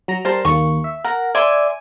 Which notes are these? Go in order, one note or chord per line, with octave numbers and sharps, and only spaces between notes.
F#3 A#5
G3 A#4 C5 A5
D#2 A#3 C#6
E5
A#4 F#5
D5 E5 G#5 C6